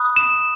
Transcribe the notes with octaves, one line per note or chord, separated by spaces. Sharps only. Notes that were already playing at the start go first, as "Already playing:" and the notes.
Already playing: B5 D#6 F#6
E7